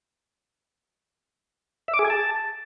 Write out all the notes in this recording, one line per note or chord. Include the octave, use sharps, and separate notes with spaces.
E5
D6
G#4
G#5
A5